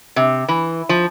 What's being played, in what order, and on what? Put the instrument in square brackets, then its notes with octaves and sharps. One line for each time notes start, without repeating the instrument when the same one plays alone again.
[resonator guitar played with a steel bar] C3
E3
F3